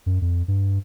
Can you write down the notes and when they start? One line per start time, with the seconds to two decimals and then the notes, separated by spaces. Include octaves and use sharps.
0.06 F#2
0.22 F2
0.48 G2